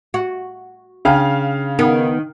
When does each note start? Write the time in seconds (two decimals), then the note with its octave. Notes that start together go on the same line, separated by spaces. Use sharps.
0.14 F#4
1.05 C#3 D4 F5 G5 A5 F6
1.79 D#3 B3